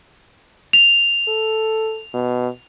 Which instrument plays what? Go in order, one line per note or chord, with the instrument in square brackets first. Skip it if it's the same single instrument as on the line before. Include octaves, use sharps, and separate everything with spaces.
[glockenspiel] F7
[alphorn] A4
B2